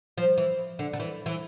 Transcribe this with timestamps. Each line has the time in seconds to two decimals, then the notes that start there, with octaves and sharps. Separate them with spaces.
0.17 F3
0.38 E3
0.79 D3
0.93 D3
1.00 E3
1.26 E3